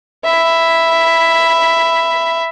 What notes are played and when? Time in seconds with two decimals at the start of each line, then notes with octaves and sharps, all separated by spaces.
0.24 E5 B5